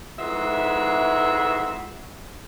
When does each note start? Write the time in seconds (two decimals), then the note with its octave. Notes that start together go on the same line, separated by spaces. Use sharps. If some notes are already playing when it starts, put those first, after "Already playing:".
0.19 F2 G#2 E3 G#3 F#4 E5